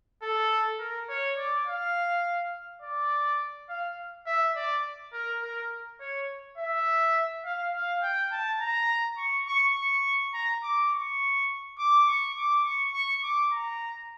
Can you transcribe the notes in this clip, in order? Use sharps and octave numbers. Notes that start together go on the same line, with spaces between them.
A4
A#4
C#5
D5
F5
D5
F5
E5
D5
A#4
A#4
C#5
E5
F5
F5
G5
A5
A#5
C#6
C#6
C#6
A#5
D6
C#6
D6
C#6
D6
C#6
C#6
D6
A#5